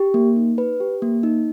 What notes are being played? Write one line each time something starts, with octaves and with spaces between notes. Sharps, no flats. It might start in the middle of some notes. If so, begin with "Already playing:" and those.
Already playing: G4
A#3
D#4
B4
G4
A#3
D#4